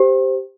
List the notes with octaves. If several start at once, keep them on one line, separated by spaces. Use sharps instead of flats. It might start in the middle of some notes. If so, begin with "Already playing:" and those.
Already playing: G4 C5